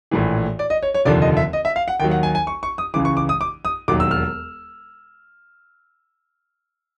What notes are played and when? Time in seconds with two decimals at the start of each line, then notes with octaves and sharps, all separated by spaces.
0.11 A#1 A2 E3
0.59 D5
0.70 D#5
0.83 C#5
0.94 C#5
1.05 F1 D#2 D3 F3 D5
1.22 D#5
1.37 E5
1.53 D#5
1.65 E5
1.76 F5
1.88 F#5
2.00 D#2 D#3 F#3 G5
2.11 F#5
2.23 G#5
2.35 G#5
2.47 C#6
2.63 C#6
2.78 D#6
2.94 C#2 C#3 E3 D6
3.05 C#6
3.17 D6
3.29 D#6
3.41 D6
3.65 D#6
3.88 E1 D#2 D#3 F#3 D6
4.00 E6
4.11 F6